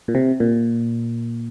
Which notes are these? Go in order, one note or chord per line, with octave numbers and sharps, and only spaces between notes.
A#2
C3
A#2